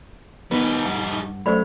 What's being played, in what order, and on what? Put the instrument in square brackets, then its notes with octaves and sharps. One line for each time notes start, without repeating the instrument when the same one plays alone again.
[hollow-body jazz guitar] D#3 B3 [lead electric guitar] G3 D#4
[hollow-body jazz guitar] G2 [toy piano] F#5
[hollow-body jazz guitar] F#2 F#3 A3 [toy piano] C5 D5 B5